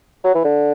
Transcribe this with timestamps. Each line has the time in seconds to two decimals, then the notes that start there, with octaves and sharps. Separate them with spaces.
0.24 F#3
0.34 E3
0.44 D3